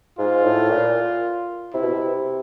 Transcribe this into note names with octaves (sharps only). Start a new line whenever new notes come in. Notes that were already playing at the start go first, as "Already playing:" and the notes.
G#2 F4
A2
A#2
C3 E4
B2
C3